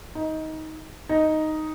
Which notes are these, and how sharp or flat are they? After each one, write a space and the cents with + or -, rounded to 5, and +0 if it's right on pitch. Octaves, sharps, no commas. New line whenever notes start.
D#4 +15
D#4 +0